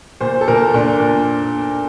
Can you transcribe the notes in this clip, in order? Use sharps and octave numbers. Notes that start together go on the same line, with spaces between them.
A#2 C5
A4
A#2 A#4
A#2 D4
A#2